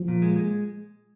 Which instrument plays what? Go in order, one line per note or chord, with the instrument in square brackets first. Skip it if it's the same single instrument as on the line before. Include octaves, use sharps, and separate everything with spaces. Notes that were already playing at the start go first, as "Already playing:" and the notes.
Already playing: [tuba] F3
[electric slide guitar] A#2
G#3
G#3